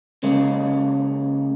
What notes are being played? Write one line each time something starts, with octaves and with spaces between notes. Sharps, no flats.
C#3 G#3 A#3